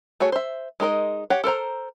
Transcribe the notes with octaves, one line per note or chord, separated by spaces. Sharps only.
A3 F#4 G#4 C#5
C5 E5
G#3 D#4 A#4 D#5
G4 C#5 F#5
A4 A#4 C5 A#5